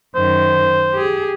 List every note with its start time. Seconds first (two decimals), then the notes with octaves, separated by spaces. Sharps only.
0.16 F#2 D#3 C5
0.93 G4 G#4